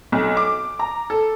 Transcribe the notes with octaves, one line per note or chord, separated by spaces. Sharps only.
B1
D6
A#5
A4